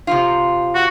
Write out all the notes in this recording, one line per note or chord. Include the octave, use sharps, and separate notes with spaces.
C3 F3 F4
F#4